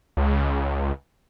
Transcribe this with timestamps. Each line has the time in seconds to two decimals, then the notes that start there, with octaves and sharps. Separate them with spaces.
0.17 C#2